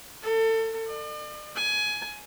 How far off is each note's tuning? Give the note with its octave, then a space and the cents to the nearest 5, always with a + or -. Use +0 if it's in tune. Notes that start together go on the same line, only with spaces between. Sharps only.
A4 +30
D5 +45
G#5 +20